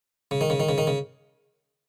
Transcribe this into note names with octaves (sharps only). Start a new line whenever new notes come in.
C#3
D#3
C#3
D#3
C#3
D#3
C#3